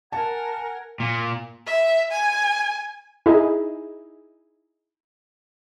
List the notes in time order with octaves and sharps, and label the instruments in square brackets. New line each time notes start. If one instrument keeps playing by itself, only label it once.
[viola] A#4 [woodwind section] F#5 G#5 [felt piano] A5
[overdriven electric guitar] A#2
[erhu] E5
G#5
[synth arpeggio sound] D#4 E4 G#4